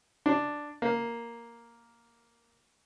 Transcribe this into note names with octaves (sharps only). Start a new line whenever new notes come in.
D4
A#3